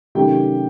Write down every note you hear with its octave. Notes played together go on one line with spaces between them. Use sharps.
C3 D#3 F#3 A3 C#4 G4 G5